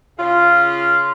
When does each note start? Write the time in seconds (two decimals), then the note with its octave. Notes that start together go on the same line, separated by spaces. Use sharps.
0.18 C#3 F4